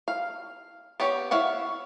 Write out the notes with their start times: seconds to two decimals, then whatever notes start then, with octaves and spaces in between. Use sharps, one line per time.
0.08 F5
1.00 B3 G4 C#5
1.31 E4 C#5 F5 F#5